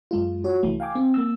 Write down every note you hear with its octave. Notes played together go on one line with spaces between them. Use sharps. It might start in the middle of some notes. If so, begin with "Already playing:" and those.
F#2 G#3 F4
F#4 C#5
C2 E3 A3
F5 G5 G#5 D6
C4
A#3 E6